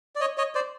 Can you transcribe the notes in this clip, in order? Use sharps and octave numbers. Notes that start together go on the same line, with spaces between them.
D5
C#5 D#5
C#5 D#5
C5 D5